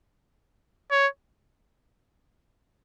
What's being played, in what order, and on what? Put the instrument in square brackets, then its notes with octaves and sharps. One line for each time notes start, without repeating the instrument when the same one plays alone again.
[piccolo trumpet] C#5